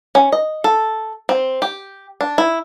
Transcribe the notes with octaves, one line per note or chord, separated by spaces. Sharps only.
C#4
D#5
A4
C4
G4
D4
E4